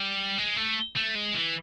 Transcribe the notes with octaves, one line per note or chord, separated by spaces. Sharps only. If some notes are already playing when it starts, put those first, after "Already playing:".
Already playing: G3
G#3
A3
A3
G#3
E3